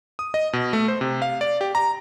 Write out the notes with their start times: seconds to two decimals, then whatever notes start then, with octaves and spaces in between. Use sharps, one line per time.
0.19 D#6
0.34 D#5
0.53 B2
0.73 A3
0.88 C5
1.01 C3
1.22 F5
1.41 D5
1.61 G4
1.75 A#5